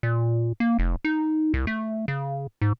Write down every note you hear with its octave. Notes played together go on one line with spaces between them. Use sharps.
A#2
A#3
F1
D#4
C2
A3
C#3
G#2